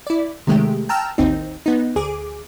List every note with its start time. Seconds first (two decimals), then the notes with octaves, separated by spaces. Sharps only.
0.07 E4 D5
0.47 C3 D#3 G#3 A3 G4
0.89 G5 A5 A#5 E6 F6
1.18 A1 D#2 C4 D#4
1.66 B3 D#4
1.96 D2 G#4 D6